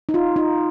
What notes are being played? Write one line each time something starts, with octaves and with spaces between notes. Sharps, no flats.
D#4
F4
D#4